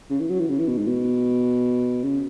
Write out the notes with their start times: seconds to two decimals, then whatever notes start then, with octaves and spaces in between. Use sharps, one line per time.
0.10 C#3
0.20 E3
0.30 F#3
0.39 E3
0.49 C#3
0.59 E3
0.68 B2
0.78 G#2
0.88 B2
2.04 C#3